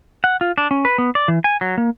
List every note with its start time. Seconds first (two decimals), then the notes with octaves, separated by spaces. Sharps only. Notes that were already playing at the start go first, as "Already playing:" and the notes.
0.24 F#5
0.41 F4
0.58 D4
0.71 C#4
0.85 B4
0.98 B3
1.15 D5
1.28 E3
1.44 G#5
1.61 F#3
1.78 A#3